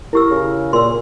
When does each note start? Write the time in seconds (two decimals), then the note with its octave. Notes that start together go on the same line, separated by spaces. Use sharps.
0.13 E4 G4 A#4 E6
0.30 C#3
0.73 A#2 C6 E6